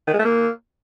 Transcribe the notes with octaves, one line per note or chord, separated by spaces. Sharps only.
D#3
G#3
A3
A#3